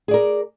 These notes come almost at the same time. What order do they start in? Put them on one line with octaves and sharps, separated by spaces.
G#4 D5 A#4